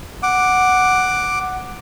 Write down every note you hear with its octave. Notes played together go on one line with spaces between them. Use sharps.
F#5 D6